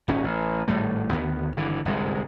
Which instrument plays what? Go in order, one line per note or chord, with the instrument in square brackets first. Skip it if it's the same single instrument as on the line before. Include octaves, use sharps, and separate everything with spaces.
[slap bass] D#1 G#1 C#4
A1
G#1 A2 G3 A3
D2 D#3 B3
G#1 G2 D3 E3
G1 C2 G#2 G#3